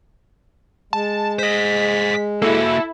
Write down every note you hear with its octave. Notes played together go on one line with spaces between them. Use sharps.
G#3 A5
C5 D#5 B6
A#3 E4 F#4 A4